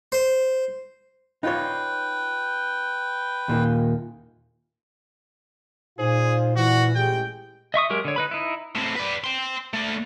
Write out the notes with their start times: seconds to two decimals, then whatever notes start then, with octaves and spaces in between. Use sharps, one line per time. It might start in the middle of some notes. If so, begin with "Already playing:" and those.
0.12 C5
1.43 D#4 F4 B4 C#5 G5
3.48 D#2 A#2 D#3
5.99 A#2 D#4 F4 G#4 C5
6.56 E3 F#4
6.95 A1 G#3 G4 G5
7.74 D#5 E5 C#6 D#6
7.90 F#3 G#3 G4 A#4
8.05 D3 C#5
8.16 D#4 B4 B5
8.31 D#4 E4
8.76 A2 C4
8.96 B4 D5
9.24 G5 C6
9.73 A3 D5